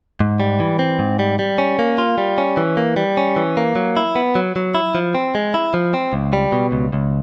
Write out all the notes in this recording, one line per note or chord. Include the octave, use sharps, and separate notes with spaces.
G#2
G3
E3
C4
G#2
G3
G3
C#4
A#3
F4
G3
C#4
E3
A#3
G3
C#4
E3
A#3
F#3
E4
B3
F#3
F#3
E4
F3
C4
G#3
E4
F3
C4
C#2
G3
B2
C#2
C#2